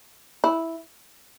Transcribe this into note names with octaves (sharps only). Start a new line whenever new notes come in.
E4